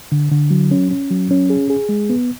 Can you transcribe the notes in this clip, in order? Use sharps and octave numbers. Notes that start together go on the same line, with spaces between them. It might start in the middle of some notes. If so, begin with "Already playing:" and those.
D3
D3
F#3
C#4
C#4
F#3
C#4
G#4
G#4
G#3
B3